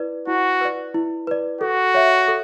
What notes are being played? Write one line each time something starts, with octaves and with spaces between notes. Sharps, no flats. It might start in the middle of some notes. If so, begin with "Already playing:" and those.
Already playing: E4 B4 D5
E4 F#4
B4 D5
E4
B4 D5
F#4 A4
C#5 E5
A4